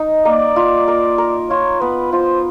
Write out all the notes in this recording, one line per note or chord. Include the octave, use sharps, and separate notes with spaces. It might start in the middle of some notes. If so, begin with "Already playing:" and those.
Already playing: D#4
A#3 D5
F4
A#4
A#4
F4 C#5
B3 B4
F4 C5